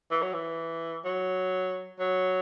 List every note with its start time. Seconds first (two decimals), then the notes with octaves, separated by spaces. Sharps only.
0.11 E3
0.22 F#3
0.33 E3
1.05 F#3
1.99 F#3